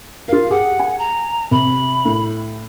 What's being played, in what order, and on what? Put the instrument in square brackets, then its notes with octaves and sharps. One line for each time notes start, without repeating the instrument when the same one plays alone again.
[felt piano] F4 A#4 [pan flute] F5
[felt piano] G4 G#4 [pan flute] F#5
[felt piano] G#5
[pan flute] A#5
[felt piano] C3 [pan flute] B5
[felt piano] A2